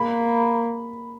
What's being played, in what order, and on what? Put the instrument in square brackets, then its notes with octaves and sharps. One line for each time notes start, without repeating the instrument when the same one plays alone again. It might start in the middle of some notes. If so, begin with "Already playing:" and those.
Already playing: [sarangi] A#3 [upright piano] B5